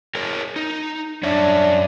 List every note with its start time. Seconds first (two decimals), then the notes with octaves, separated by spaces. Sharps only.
0.15 G#4 A#4 C#5
0.56 D#4
1.23 F#2 D4 C#5 E5